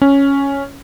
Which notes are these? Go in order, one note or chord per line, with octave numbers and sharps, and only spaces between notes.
C#4